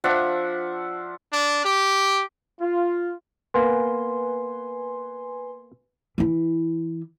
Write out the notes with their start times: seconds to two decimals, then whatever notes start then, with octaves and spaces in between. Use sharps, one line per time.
0.04 F3 D4 E5 F#5
1.32 D4
1.65 G4
2.60 F4
3.54 A#3 B3 B4 G#5 C6
6.18 E3 E4